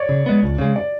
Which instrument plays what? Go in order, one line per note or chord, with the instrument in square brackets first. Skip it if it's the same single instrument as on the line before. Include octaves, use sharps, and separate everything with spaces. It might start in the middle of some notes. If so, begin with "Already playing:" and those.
Already playing: [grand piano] C#5 D5
[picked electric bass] C#3
G#3 B3
C#2
C#3 G#3
[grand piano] D5